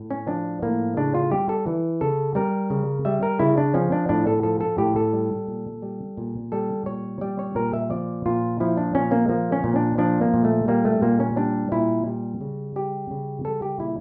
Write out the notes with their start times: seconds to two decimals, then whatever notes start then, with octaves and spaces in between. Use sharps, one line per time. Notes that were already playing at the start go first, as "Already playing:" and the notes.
Already playing: A2
0.11 C#4
0.27 F3 D4
0.62 A2 A#3
0.97 C#3 D4
1.14 F4
1.31 G3 G4
1.49 A4
1.66 E3
2.01 C#3 A4
2.35 G3 A#4
2.70 C#3
3.05 G3 E5
3.23 A#4
3.39 C#3 E4
3.58 D4
3.74 F3 C#4
3.92 D4
4.09 A2 D4
4.27 A4
4.43 F3 A4
4.61 A4
4.78 A2 G4
4.96 A4
5.13 G3
5.48 A#2
5.82 G3
6.17 A#2
6.52 G3 A4
6.86 A#2 C#5
7.21 G3 D5
7.39 C#5
7.55 A#2 A#4
7.73 E5
7.90 F3 D5
8.26 A#2 F4
8.60 F3 E4
8.77 D4
8.95 A#2 C#4
9.11 A#3
9.29 F3 A#3
9.52 C#4
9.64 A#2
9.76 D4
9.98 F3 D4
10.21 A#3
10.34 A#2
10.44 A3
10.68 G3 A#3
10.85 A3
11.02 A#2 A#3
11.20 C#4
11.37 G3 D4
11.72 A#2 E4
12.06 G3
12.41 C#3
12.76 G3 G4
13.11 C#3
13.45 G3 A4
13.62 G4
13.80 A#2 E4